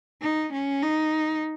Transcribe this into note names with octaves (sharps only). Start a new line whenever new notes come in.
D#4
C#4
D#4